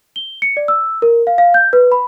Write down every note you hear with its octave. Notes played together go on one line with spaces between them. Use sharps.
G7
C#7
D5
E6
A#4
F5
F5
G6
B4
B5